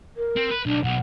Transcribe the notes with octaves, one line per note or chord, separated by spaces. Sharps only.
A#4
C4
B4
B1 D4
B1 F#5